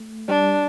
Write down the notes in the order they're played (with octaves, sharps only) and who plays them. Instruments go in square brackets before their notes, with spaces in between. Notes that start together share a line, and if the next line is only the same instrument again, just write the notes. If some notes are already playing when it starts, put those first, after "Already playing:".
Already playing: [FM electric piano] A3
[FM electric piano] G3 [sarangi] D4